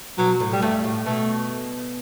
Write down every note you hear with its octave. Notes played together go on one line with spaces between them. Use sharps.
B2 F#3
A2
G3
G2 A3
A2
B2 A3